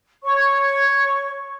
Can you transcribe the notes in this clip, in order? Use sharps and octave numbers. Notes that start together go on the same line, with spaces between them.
C#5 C#6